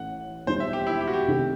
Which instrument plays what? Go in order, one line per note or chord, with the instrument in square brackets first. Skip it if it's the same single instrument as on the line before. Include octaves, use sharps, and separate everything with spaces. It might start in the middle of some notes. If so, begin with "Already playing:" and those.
Already playing: [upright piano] A1 A2 E3 [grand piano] F#5
[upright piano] E1 D#2 D#3 G3 [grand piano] C5
[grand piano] E5
G4
E4
G4
F#4
G4
[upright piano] C2 C3 D#3 A3